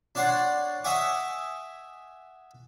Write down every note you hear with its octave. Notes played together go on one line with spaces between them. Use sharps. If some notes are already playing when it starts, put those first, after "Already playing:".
D4 C#5 D5 F#5 C6
D#5 E5 F#5 G#5 C#6 D6